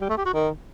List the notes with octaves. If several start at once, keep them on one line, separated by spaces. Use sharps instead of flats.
G3
A3
G4
F#4
D#3